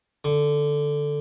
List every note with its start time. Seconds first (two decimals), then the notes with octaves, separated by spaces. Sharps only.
0.25 D3